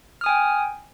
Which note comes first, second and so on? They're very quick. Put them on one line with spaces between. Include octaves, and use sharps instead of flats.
F6 D#6 G#5 G5